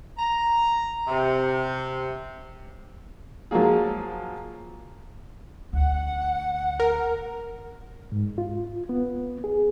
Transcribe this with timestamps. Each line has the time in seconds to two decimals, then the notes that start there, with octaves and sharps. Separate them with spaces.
0.17 A#5
1.07 C3
3.51 F3 F#3 G#3 A#3 G#4
5.73 D2 F#5
6.80 A#4
8.12 G#2
8.38 F4
8.89 B3
9.44 G#4